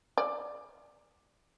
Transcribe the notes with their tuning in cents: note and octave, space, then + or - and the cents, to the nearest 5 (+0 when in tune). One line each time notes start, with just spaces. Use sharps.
D5 +10